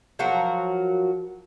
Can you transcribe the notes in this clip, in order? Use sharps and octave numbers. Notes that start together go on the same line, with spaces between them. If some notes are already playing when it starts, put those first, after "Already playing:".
F3 F#3 F#4 A#4